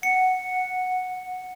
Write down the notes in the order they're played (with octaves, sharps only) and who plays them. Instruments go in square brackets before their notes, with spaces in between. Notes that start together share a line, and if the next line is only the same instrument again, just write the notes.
[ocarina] F#5 [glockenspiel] C#7